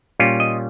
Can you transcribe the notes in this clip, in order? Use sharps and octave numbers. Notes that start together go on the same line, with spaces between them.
A#2 G3 C#4 F4
D#5